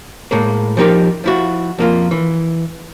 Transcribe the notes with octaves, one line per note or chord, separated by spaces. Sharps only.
A2 G#3 A#3
F3 G3 D#4 G4 A#4
F3 E4 F#4
F2 A#3 F4
E3